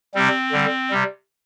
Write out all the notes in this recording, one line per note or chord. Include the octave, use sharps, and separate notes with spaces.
C3 G3 C4
D3 G3
C3 G3